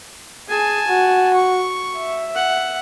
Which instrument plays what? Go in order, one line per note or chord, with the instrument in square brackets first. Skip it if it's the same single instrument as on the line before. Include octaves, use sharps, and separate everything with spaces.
[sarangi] G#4 [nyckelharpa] G#5 A5
[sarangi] F#4
[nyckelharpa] C#6
[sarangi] E5
[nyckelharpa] F#5